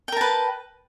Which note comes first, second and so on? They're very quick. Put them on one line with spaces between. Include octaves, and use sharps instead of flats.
G5 A#4 A5 B4